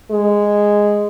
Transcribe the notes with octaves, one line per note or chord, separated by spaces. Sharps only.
G#3